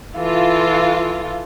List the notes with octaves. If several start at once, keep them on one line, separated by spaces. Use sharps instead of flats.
E3 F4 A4